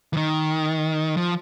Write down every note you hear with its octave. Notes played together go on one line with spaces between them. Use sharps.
E3
D#3
F3